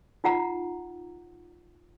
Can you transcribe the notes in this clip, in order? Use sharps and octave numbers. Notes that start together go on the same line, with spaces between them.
D#4 F4 F#5 A#5